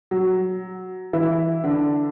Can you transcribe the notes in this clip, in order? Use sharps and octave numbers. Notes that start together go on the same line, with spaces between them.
F#3
E3 E4
D3 D4